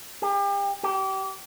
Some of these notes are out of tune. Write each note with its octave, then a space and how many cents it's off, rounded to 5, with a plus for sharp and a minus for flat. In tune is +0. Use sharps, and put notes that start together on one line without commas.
G4 +35
G4 -30